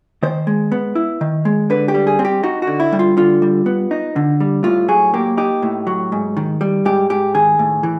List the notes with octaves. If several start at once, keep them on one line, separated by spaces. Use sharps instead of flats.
D#3 C5
G#3
B3
E4
D#3
G#3
D3 B4
G4
G3
G#4
C4
G4
D#4 F#4
F#4
D3
E4
G3
F4
D3 F4
G3
B3
D#4
D3
G3
A2 F4
F#3 G#4
A#3 G4
D#4 G4
A2
F#3
G#2
D#3
G3
G#2 G4
G#2 G4
D#3 G#4
A2
E3